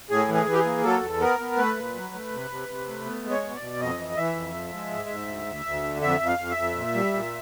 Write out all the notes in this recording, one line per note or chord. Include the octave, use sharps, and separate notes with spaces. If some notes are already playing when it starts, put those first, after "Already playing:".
A2 G#4
E3
G#4
E3
G4
G#4
A#3
F#3 A4
E2
B3 A#4
B3
A3 B4
A#2
F#3
A3
C3
C3
C3
A3
B3
G#3
C#5
B2
D5
B2
F2 D#5
E3
E3 E5
F2
F3
G#3
G#2
G#2
D2
D2
D2
D3
F2 E5
F2
F5
F2
E5
F2
A#2
G3
A#2